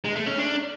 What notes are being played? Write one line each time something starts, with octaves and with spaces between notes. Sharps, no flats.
G#3
A3
C#4
D4